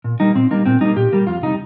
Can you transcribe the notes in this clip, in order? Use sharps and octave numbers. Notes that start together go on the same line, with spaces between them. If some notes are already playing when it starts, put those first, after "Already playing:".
A#2
G3 A#3 D#4
A#2 C4
G3 A#3 D#4
A#2 C4
G3 A#3 D#4
A#2 G4
G3 A#3
F2 F4
C3 G3 D#4